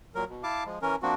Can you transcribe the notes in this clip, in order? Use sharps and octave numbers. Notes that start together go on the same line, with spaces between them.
A#2 F#3 A#4
B2
E4 F5 A5 D6
F3 G#3
E3 C#4 A#4
F3 A#3 C4 D4 F#4